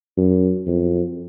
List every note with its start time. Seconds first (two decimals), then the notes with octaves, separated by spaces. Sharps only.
0.18 F#2
0.67 F2